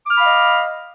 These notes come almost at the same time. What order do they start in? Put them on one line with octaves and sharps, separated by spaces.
D6 F6 B5 F5 D#5